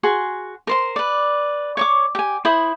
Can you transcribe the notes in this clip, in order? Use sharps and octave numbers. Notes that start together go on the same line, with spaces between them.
F#4 G#4 C6
A#4 C5 C6
B4 D5
C#5 C#6 D6
G4 G#5
E4 C5 B5 D#6